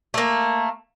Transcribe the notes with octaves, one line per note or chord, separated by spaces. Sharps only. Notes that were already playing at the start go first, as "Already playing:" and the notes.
A3 A#3